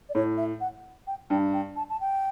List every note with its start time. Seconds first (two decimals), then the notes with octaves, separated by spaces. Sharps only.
0.09 D5
0.14 A2 C#5
0.37 E5
0.60 F#5
1.07 G5
1.30 G2 G5
1.53 G5
1.76 A5
1.90 A5
2.00 G5